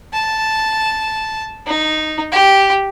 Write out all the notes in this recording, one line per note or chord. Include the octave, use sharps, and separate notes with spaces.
A5
D#4
G4